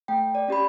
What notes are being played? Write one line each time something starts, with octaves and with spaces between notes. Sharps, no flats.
A3 G5
D5
C#4 G4 B5